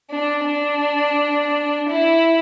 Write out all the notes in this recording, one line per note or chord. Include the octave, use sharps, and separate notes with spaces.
D4
D4
E4